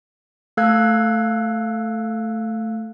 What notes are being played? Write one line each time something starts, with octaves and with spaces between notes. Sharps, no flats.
A3 A4 F5 E6 F#6 G#6